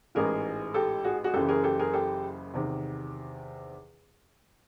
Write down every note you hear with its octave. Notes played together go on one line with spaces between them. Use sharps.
A1 G#2 E3 G#4 A#4
G4 A4
F#4 G#4
F#4 G#4
F#1 F#2 C#3 E3 G4 A4
G#4 A#4
G4 A4
G#4 A#4
G4 A4
E2 C3 D#3